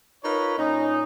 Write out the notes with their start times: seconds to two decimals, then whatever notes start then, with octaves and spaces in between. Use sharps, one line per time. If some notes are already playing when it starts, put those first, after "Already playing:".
0.24 D#4 F4 A#4 B4 C#5
0.58 A#2 C#4 D#4